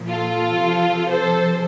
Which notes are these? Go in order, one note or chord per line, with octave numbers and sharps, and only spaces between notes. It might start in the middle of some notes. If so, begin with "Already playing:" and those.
Already playing: A#2 F3
F4 A4
C3 F3
A4 C5